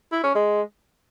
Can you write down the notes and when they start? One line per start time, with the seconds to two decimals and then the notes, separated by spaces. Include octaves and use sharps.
0.12 E4
0.24 C#4
0.35 G#3